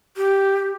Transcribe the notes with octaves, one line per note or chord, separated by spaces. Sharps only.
G4